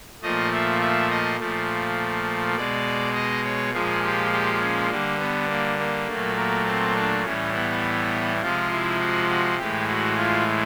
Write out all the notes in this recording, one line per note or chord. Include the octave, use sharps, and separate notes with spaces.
A#2 F3 A3 D#5
E5
E5
D#5
A#2 F3 A3
B2 G#3 D5
D#5
C#5
A#2 F3 G#3 G#4
G4
G4
C#4
D3 G3 A#3
B3
A#3
A#3
A#2 F#3 A3
A#3
C4
D4
A2 E3 G3 C#4
B3
C3 F3 G#3 F4
E4
F#4
F#4
A2 E3 G#3 G4
F#4
F4